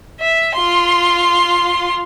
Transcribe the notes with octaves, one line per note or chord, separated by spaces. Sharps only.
E5
F4 C6